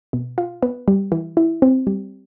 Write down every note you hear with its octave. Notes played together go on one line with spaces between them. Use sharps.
B2
F4
B3
G3
E3
E4
C4
G3